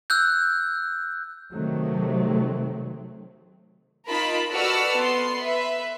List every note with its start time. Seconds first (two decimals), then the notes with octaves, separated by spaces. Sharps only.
0.10 E6 F#6 G6
1.51 C3 D#3 F#3 A3 C4
4.07 D#4 F4 A#4 A5 B5
4.52 F#4 A4 B4 D5 E6 F6
4.96 B3 C6
5.38 B4 E5